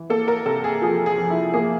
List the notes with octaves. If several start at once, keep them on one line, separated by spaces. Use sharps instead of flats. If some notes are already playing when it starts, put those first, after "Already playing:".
Already playing: E3
A#3 A4
A#4
C3 A4
G#4
F3 G#4
G#4
F2
E4
A#3 G#4